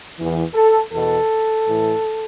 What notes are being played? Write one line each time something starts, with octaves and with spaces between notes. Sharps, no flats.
E2 E3
A4
E2 B2 A4
A2 E3